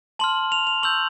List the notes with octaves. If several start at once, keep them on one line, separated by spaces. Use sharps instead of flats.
A5 C6 F6 F#7
F7
F7
C#6 E6 G6 F#7